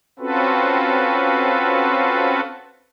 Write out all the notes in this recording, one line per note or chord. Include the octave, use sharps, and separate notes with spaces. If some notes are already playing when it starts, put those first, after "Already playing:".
C4 C#4 F4 F#4 A4 B4